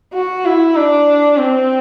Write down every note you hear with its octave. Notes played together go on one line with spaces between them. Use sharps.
F#4
E4
D4
C4